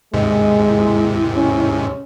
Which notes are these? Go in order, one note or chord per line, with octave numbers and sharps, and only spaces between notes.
D#2 G#2 C3 G#3 D#5
E4
C#4